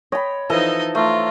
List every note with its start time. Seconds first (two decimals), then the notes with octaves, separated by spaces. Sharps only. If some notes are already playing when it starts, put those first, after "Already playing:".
0.12 C#5 D#5 G5 B5
0.50 E3 F3 D#4 A4 D#5
0.95 A3 F4 A#5